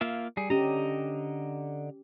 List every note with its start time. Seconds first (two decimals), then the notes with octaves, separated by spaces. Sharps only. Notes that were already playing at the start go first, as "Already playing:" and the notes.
0.01 A#3 F4 E5
0.37 G3 G#4
0.50 D3 C#4 G4 D#5 A#5